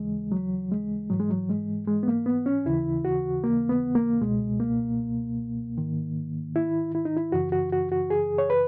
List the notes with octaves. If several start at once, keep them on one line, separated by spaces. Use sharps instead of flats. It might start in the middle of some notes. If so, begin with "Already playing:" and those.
Already playing: D#2 C#3 E3 G#3
F#3
G#3
G#2 E3 F#3
G#3
F#3
G#3
G#3
B3
A#3
B3
C#4
D#2 C#3 E3 E4
F#4
A#3
B3
A#3
C#2 B2 G#3
A#3
G#2 D#3
E4
E4
D#4
E4
F#2 C#3 E3 F#4
F#4
F#4
F#4
G#4
C#5
B4